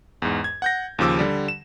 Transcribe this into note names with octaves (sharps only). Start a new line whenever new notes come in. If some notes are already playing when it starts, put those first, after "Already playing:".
E2 G#2
G#6
F#5 G6 A#6
D#2 C#3 F3 D6 E6
D3 G3
E7